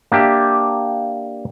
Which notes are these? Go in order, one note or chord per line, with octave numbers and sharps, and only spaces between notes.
A#3 D4 G4 E5